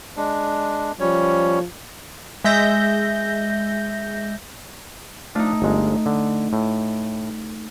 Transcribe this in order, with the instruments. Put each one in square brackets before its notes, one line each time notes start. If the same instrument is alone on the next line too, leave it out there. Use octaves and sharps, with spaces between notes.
[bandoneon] G#3 D4
[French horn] F3 [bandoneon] G3 C#4 C#5
[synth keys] G#3 E5 G6 A#6
[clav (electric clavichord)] F3 D4 F5 [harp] A3 D#4
[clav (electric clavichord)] G1 G#3
D3
A2